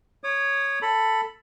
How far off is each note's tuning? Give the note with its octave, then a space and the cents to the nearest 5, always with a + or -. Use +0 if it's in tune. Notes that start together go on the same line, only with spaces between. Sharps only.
C#5 +0 D#6 -40
A4 +10 B5 +0